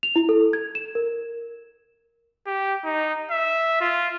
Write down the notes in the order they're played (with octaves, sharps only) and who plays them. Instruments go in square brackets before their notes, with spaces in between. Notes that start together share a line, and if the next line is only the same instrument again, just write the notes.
[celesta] F7
E4
A4
G#6
E7
A#4
[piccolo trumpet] G4
D#4
E5
F4